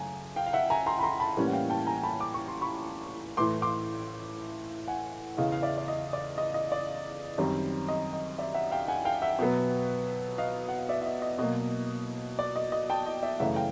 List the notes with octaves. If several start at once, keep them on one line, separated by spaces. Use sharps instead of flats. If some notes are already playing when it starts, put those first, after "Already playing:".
Already playing: F#2 C#3 A3 G#5
F5 G5
F5
E5 F#5
G#5 A#5
A#5 C6
B5
A#5 C6
A5 B5
A2 E3 G3 A#3 C#4
F#5
F5 G5
G5 A5
G#5 A#5
A5 B5
D6
C#6
C6
B5 C#6
A2 E3 A3 C6 D6
C6 D6
F#5 G#5
E2 C#3 E3 D#5 F5
F5
D5 E5
D5
D#5
D5
D#5
D#5
D5
F#2 D#3 G3 C4
D#5
D#5
D5 E5
E5 F#5
F5 G5
F#5 G#5
F5 G5
E5 F#5
B2 F#3 B3
D#5 F5
F#5
F5
D5 E5
E5
D#5
D#5
B2 F#3 A#3 D#5
D5
D#5
D#5
G5 A5
D#5
D5 E5
F#2 C#3 E3 A3 E5 F#5
F5 G5